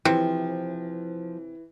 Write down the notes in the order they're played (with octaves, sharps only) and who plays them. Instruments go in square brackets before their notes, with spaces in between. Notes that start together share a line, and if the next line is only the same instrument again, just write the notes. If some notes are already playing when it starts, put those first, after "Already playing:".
[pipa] C3 [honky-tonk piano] E3 [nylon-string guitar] F3